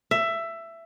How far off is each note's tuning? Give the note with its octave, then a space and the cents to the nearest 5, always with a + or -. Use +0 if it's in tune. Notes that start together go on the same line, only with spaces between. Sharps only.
E5 +15